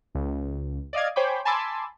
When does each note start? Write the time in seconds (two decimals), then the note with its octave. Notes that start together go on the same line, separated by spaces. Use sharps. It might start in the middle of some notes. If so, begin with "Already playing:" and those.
0.15 C#2
0.93 D5 D#5 F5 G#6
1.16 C5 C#5 G5 G#5 B5 D6
1.45 G#5 A5 B5 C6 D6 E6